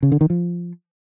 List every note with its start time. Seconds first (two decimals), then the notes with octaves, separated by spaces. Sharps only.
0.03 C#3
0.12 D3
0.21 D#3
0.30 F3